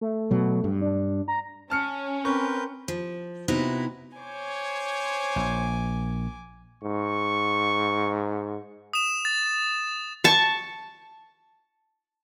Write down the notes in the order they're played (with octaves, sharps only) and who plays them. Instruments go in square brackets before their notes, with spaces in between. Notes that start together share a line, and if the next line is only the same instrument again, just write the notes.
[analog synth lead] A3
[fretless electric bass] B2 F#3
G2
[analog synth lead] D4
A#5
[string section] C#4 [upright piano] A5 F6 C#7
[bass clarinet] C4 [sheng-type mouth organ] A#4 B4 G6 [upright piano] C#6
[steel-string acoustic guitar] F3
C3 B3 D#4 E4 F#4
[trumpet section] C5 C#5 [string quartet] G#5 D6
[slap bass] A#1
[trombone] G#2 [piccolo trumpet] C#6
[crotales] D#6 E7
A6
[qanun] A5 C#6